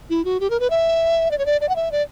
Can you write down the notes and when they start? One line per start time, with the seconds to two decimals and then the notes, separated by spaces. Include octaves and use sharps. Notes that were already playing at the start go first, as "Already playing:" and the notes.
0.10 E4
0.25 F#4
0.40 G4
0.50 A#4
0.60 B4
0.70 E5
1.31 D5
1.38 C#5
1.46 D5
1.61 D5
1.69 F#5
1.76 E5
1.92 D5